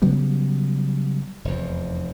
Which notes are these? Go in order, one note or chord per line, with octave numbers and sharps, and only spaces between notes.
C#3 F#3 G3 B3
F1 E2